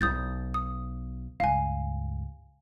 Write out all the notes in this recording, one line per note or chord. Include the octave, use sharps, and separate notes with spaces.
B1 D#6 G6 A6
D#6
C#2 G2 F5 G#5